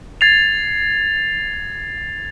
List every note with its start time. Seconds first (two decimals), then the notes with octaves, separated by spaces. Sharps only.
0.21 G#6 A6 C7 F7